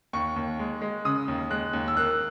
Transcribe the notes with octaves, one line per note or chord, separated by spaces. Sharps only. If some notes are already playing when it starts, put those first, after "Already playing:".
D#2 C#6
D#2
G#3
G#3
C#3 D#6
D#2
G#3 F#6
D#2
E6
A#3 F#6